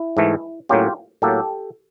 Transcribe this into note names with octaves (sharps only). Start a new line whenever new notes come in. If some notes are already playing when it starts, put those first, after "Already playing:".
Already playing: E4
G#2 E3 A3
A2 F#3 A#3 C#4 F4 G4
A2 F#3 A#3 G4 A4